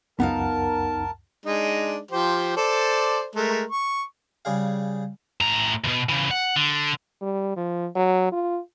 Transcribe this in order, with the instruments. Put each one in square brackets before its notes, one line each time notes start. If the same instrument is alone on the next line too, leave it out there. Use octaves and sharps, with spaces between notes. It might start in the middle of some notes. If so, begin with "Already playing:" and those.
[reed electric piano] C#2 F#2 F#5 [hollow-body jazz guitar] B3 D#4 F5 [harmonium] A#4 A5
[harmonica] G#3 D4 D#4
F3 G4 C5
A4 C5 D5
G#3 A3 A#4
C#6
[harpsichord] C#3 G3 G#4 F5
[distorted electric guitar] A2 A#5
D2 B2
C#3 E3
F#5
D3
[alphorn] G3
F3
F#3
F4